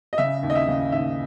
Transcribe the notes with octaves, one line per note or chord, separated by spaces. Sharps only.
D#5
C#3 E5
D#2
D#5
E5
C#3
D#2 E5